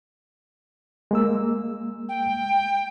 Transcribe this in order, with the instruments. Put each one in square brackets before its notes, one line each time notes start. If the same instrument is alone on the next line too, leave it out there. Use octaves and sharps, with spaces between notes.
[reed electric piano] G#3 A#3 E6
[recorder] G5